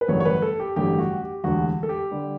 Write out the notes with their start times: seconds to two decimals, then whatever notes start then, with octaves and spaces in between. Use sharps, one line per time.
0.01 B4
0.08 A1 G2 D3 F#3 A3 C#5
0.20 C#5
0.25 B4
0.42 A4
0.60 G4
0.76 A1 G2 D3 F#3 A3 G4
0.99 F#4
1.21 G4
1.44 E1 D2 D3 G3 F#4
1.83 A4
1.89 G4
2.11 D3 G3